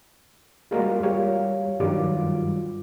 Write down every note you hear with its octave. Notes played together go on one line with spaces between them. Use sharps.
G3 G#3 A#3 F4 F#4 A#4
G3 G4 C#5 F5
G2 D#3 F#3 G3 F4 D6